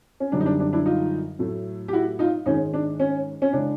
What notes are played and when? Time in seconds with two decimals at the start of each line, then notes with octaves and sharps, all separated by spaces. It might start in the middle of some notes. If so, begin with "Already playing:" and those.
0.20 C#4
0.32 F#2 D3 G3 D4
0.40 D#4
0.46 D4
0.60 D4
0.73 D4 E4
0.86 D#4 F4
1.39 A2 F#3 A3
1.88 G4
1.93 E4 F#4
2.19 D#4 F4
2.46 G#2 D#3 G#3 C#4 D#4
2.74 D4
3.00 C#4
3.42 C#4
3.53 C#3 E3 G#3 D4